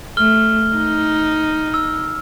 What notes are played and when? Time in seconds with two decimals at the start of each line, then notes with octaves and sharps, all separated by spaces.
0.17 A3 F6 G7
0.76 D#4
1.74 E6